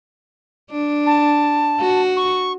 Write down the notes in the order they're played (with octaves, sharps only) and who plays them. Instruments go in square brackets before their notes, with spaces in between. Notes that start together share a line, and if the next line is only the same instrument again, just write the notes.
[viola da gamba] D4
[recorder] A5
[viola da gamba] F#4
[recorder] C#6